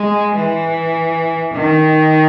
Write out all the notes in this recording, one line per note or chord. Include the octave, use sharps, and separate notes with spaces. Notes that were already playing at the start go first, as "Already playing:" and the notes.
Already playing: G#3
E3
D#3